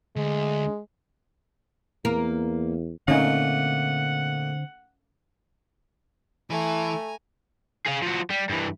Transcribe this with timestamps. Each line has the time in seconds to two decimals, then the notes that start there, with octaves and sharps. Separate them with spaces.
0.16 D2 G#3
2.05 E2 A#3 A#4
3.08 A#2 D3 A3 A#3 C4 C#4 D#4 F#5
6.50 E3 A3 G#5 A#5
7.87 G#4 F5
8.02 F3 F#4
8.30 G3
8.49 G2 E3